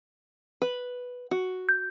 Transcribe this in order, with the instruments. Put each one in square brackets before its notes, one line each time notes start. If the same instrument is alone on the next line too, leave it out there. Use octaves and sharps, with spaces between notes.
[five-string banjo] B4
F#4
[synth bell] G6